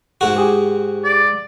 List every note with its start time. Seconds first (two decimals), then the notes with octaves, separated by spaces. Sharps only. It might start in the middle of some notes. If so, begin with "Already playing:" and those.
0.21 G#2 F#4
0.36 G4 G#4
1.04 D5